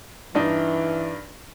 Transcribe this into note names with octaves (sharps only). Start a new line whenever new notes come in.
G2 E3 D4 D#4